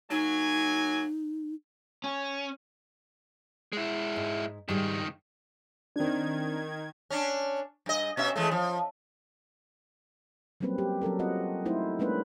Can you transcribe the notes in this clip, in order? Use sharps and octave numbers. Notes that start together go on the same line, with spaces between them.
F#3 A#3 D#4 G#5
C#4
G#3 E4
G#2
C#2 G#2 D#3 G3 D4
D#3 C4 D4 G#6
C#4 D4
G2 D#5
B2 C#4 E5
E3 G#3 A3
F3
F#3 G3 A#3 C4 C#4 B4
G4
F#3 C#4 A4 A#4
C4 F4 D#5 F#5
A3 D#4 E4 C5
G#3 A#3 C#4 D4 B4